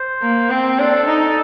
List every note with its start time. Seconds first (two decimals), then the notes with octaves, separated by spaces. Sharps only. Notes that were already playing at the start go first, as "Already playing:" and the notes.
Already playing: C5
0.22 A#3
0.50 C4
0.78 D4 A4
1.07 D#4